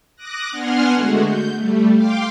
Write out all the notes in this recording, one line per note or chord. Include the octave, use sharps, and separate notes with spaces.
D6 D#6 F#6 A#6
B3 D4 F#5 G#5 C6 F6
D3 G#3 A3 F#4
G6
G3 A3
F5 G5 C6 D6